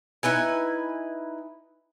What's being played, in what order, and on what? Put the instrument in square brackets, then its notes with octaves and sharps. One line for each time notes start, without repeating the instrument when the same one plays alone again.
[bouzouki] D#4 E4 B4 G#5